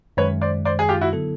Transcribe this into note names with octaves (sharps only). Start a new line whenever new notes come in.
F#2 D#3 G#3 B4 C#5
C5 D5
C5 D5
G#4
F4 G4
E4 F#4
D3 F#3 B3 E4 A4